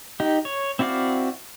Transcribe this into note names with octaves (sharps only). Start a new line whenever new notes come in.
D#4 G4
C#5
C4 E4 F#4 D5 F5